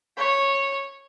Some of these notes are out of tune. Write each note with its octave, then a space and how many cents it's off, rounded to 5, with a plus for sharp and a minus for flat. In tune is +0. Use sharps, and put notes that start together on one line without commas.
C#5 -10